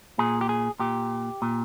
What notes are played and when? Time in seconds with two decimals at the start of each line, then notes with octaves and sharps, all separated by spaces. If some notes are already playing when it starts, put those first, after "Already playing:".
0.19 A#2 G#4
0.41 G4
0.49 G#4
0.80 A#2 G4
1.42 A#2